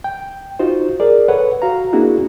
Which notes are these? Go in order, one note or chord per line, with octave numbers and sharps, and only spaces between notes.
G5
D#4 F4 F#4 C5
G#4 A#4 D5
A4 B4 C#5 F#5
F#4 F5 A#5
A#3 C4 D4 E4 F#4 G#4